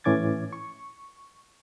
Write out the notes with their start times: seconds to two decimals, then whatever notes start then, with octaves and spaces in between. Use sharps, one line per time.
0.04 A2 E3 C#4 D6 G#6 A6
0.53 C#6